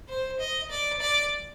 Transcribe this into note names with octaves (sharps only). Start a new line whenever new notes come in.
C5
D#5
D5
D5